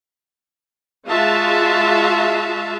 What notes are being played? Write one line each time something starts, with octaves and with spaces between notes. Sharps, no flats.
G#3 F4 F#4 E5 F5 A5